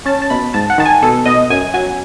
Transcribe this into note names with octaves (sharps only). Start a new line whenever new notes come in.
C#4 A5
A5
B2 B5
G#2 A5
F#5
D#3 A5
G#5
B2 A4
B2 D#5
F#2 G#5
F#3 G#5